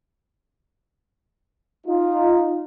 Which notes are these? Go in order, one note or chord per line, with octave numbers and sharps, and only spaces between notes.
D#4 F4